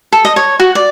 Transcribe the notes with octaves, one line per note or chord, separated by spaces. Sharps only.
A4
D#5
C#5
F#4
D5